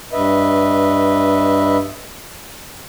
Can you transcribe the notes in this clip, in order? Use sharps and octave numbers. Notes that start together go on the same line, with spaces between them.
G2 B4 D#5 E5